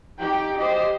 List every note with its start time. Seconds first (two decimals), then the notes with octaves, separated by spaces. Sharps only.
0.19 D#4 G4 G5
0.57 G4 C5 D#5